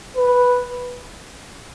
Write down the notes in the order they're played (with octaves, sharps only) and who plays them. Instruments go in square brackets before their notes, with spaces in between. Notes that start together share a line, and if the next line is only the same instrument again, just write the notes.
[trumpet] B4